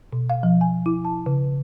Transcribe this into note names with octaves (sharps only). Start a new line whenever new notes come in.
B2
F5
F3
G#5
E4
A5
C#3